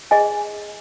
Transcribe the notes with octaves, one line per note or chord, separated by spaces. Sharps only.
G#4 D#5 G#5